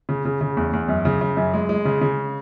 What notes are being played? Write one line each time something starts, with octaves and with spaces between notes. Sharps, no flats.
C#3
C#3
C#3
E2
E2
F#2
C#3
C#3
F#2
G#3
G#3
C#3
C#3